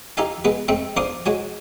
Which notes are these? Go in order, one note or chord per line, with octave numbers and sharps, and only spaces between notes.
D#4 G4 A4 E5 F5 G#5
G#3 B3 G#4 B4
G#3 A3 C4 E5 G5
B1 D4 C5 F5 D6 D#6
G#3 F#4 C#5 G#5